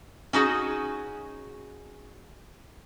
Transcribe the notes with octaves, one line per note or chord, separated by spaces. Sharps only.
C#4 D#4 F#4 G#4